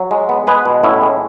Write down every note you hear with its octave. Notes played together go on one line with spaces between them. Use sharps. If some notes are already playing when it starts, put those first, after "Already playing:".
Already playing: F#3
G#3
B3
G#3 G#4 B4
B2
A2 C#4 E4
G#3